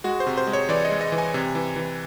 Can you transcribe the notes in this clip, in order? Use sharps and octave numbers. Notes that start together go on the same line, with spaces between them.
G#3 F#4
C5
C3
C5
G#3
C#5
E3 D5
D#5
G#3
D#5
E3
G#5
C3
E3
E3